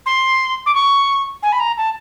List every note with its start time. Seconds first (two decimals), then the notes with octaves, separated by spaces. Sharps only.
0.06 C6
0.66 D6
0.75 C#6
1.43 G#5
1.52 B5
1.60 A#5
1.77 A5